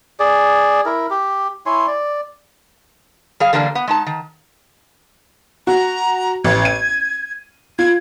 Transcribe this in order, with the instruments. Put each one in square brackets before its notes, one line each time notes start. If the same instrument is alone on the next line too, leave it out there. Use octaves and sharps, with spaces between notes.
[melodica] G#4 D5
E4 A#4
G4
E4 C#5 G#5 C6
D5
[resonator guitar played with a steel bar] G3 G#4 F5
D3 E3 G3 A#3 D4
B3
G#3 D#4 A5
D#3
[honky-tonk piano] F#4 [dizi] A#5
[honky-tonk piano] A1 [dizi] G#6
[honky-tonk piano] D#7
[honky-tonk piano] F4 [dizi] G#6